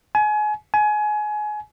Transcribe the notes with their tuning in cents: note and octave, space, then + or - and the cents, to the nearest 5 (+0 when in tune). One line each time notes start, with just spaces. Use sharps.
G#5 +30
G#5 +25